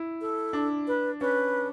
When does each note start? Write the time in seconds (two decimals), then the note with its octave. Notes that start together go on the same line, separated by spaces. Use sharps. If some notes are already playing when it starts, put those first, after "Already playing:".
Already playing: E4
0.21 A4
0.53 D4
0.87 B4
1.21 C#4 B4